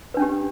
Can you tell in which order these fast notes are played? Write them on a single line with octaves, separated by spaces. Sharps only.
B4 D4 C#4 G4